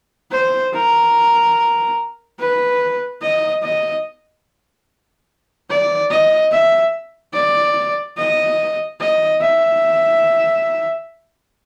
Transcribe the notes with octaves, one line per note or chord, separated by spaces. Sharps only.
C5
A#4
B4
D#5
D#5
D5
D#5
E5
D5
D#5
D#5
E5